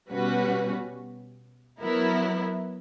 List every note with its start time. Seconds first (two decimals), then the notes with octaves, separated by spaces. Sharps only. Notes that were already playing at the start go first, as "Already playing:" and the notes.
0.11 B2 G3 C#4 F#4 B4
1.81 F#3 B3 E4 A#4